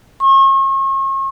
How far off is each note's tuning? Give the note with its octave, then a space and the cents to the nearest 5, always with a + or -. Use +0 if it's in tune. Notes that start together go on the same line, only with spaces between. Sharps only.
C#6 -40